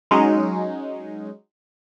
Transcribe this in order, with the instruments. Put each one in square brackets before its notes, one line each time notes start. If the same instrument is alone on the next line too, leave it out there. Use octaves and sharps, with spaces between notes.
[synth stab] F#3 G#3 C#4 D#4